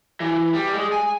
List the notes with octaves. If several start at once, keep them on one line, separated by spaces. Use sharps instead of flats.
E3
G3
G#3
G#5